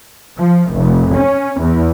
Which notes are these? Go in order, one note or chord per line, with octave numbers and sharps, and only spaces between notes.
F3
F1
C#4
E2